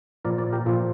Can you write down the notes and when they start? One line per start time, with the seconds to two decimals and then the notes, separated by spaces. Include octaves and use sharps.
0.25 A#2 F3 A#4 D5
0.38 A#4 D5
0.52 G4 A#4
0.66 A#2 F3 F4 A4